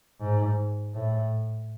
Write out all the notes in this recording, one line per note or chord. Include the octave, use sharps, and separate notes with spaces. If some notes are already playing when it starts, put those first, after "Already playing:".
G#2
A2